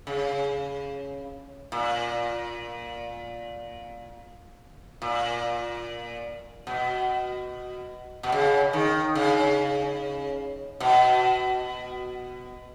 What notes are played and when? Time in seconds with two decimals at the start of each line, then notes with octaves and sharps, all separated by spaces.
0.07 C#3
1.72 A#2
5.02 A#2
6.67 B2
8.23 B2
8.32 C#3
8.73 D#3
9.15 C#3
10.80 B2